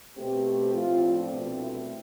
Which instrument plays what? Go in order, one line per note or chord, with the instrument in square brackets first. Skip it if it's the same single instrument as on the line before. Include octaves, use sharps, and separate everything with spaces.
[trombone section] B2 A3 C4 G4
A2 F3 C4 F4
D4
C2 B2 A3 C4
E4